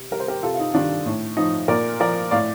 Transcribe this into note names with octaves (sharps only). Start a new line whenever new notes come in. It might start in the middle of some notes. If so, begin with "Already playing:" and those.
Already playing: C3
G3 A#4
C5
G4 A#4
C3 F4 A4
F4
D#4
D#3 G3 D4 F4
A2
F3 D#4
A#2 A#4 D5
F3 A#4 D5
A2 D5 F5